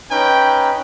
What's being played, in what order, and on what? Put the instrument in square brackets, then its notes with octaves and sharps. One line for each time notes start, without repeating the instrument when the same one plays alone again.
[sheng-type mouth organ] C#4 D#4 B4 [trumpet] G5